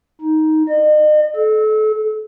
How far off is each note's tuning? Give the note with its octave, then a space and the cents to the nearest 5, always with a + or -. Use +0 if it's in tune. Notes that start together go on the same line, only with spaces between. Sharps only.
D#4 +10
D#5 -40
A4 -30